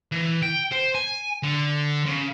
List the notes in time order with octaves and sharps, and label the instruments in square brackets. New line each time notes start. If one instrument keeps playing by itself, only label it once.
[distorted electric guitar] E3
G5
C5
G#5
D3
C#3